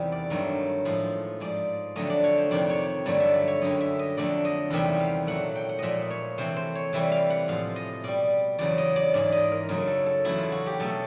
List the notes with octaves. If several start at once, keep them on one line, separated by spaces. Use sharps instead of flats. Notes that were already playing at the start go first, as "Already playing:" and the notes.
Already playing: E2 C3 D#3 G3
D5
G2 D#3 F#3 A3
A2 F3 G#3
G#2 F3 G#3 D5
F2 D3 F#3 A3 D#5
D5
C#5
C5
F2 C3 D#3 D5
C#5
G2 D3 F#3 A3 D5
E5
D5
C#5
F#2 D3 G3 D#5
E5
D#5
F2 D3 F#3 A3 D5
D#5
E2 C3 D#3 G3 E5
F5
A#2 F#3 A3 F#5
G5
F#5
A#2 F3 G#3 D#5 E5
C#5
C3 E3 A3 C5
C5
C#5
C3 E3 G3 E5
F5
F#5
A2 F3 G#3 F5
D#5
B2 G3 D5
E2 C#3 F#3 D5
D#5
D5
G#2 E3 G#3 D5
D#5
A#4
F#2 C#3 F#3 A3 A#4
A4
A4
E2 C#3 F#3 A3 E4
F4
F#4
G4
B2 F#3 A3 A4